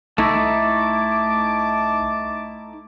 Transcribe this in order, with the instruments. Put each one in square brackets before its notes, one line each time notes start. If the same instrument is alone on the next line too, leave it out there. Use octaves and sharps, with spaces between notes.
[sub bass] C2 [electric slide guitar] A3 D#4 E4 [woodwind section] A5 D6